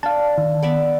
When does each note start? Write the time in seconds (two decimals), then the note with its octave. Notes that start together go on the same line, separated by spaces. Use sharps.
0.03 D4 F5 A5
0.38 D#3
0.63 B3 D5 E5